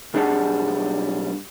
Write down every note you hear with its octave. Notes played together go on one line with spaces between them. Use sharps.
B1 G3 D4 G#4 F#5 A5